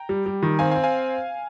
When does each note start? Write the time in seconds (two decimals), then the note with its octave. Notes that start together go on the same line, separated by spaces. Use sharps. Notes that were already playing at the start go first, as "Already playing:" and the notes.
Already playing: G5 A#5
0.09 G3
0.26 G3
0.43 D#3
0.59 C4 F5 G#5
0.71 F5 G#5
0.76 C4
0.84 F5 G#5